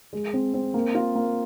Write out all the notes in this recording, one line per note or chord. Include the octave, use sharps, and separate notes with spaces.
G#3
C4
C4
A#3
F4
A#3